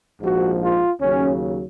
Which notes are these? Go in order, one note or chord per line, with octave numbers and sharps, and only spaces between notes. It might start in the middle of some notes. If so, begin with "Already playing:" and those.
A#1 G#2 F3 F#4
F4
D#2 C#3 F#3 C#4